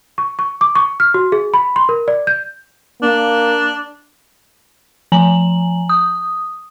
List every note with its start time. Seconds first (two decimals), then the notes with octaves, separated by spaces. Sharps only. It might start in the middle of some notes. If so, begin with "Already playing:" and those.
0.18 C#6
0.39 C#6
0.61 D6
0.76 C#6
1.00 F6
1.14 F#4
1.32 G#4
1.54 B5
1.76 C6
1.89 A#4
2.08 D5
2.27 G6
3.02 A#3 D4
5.12 F3 G#5 A#5 F#7
5.89 D#6